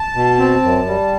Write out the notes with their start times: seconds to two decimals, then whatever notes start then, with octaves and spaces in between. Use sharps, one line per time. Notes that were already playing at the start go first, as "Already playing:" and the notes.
Already playing: A5
0.15 B2
0.39 C4
0.63 F#2
0.87 G3